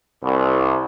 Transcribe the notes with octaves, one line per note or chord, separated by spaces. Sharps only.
C2